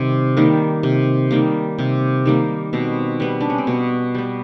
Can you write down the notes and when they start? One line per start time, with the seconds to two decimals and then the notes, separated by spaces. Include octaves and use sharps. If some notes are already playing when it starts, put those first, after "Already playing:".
Already playing: C3 D#3 G3
0.37 D#3 G3 A#3
0.83 C3
1.31 D#3 G3 A#3
1.78 C3
2.26 D#3 G3 A#3
2.73 B2 C4
3.20 G3 B3
3.40 D4
3.50 C#4
3.58 C4
3.67 B2 B3
4.14 G3 B3